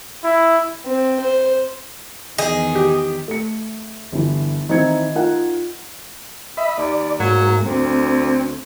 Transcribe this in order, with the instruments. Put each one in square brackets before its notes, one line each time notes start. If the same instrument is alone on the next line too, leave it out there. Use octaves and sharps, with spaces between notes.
[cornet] E4
[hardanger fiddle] C4
C5
[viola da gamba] E2 D#3 [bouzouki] G#4 [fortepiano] D#5
[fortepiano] G4
[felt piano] A3 C#7
G1 E3
D#3 E3 C4 D#4 G#6 C#7
D#4 F4 A#4 F#5
[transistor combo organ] D#5 E5 B5
[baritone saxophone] D#2 [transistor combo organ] D5
[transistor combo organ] G#2 A#3 [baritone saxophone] F#3
[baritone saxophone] D2 [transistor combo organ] C4